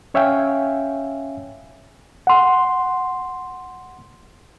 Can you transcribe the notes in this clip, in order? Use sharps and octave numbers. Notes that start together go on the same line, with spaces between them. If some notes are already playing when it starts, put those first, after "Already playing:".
C#4 C#5 E5 F5 G5 G#5
F#5 C6